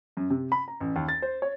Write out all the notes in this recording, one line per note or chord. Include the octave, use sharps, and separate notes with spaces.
F#2
C3
B5
A#5
A1
D#2
A6
C5
C#5